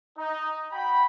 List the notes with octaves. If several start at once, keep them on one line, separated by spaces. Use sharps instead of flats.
D#4
F#4 G5 B5